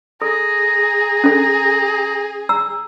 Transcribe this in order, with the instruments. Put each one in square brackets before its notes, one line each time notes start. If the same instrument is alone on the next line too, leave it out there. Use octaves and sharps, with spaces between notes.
[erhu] G#4 [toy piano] A4 [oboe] A#5
[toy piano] C#4 A4
A#5 E6